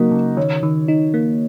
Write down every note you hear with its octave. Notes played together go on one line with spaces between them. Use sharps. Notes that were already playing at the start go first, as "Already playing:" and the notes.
Already playing: C#3 F#3 A#3 D#4 F#4 A#4
C#3
D#3 C#5
D#3
D#4
A#3